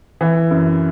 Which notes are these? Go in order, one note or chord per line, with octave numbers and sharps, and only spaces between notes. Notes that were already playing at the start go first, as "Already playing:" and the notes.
E3
F#2